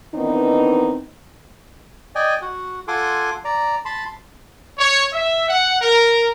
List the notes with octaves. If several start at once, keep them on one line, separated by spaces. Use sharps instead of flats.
D#3 E3 B3 C4 D4 D#4
D5 D#5 G5 G#5
F#4 F#5
F4 A4 F#5 G#5 C6 D6
D5 A#5
A5 B5 C6
C#5
E5
F#5
A#4